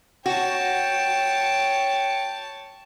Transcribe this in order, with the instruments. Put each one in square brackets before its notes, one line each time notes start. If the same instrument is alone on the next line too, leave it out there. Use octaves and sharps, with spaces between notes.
[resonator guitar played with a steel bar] F#4 [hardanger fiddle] C#5 A5 [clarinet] G5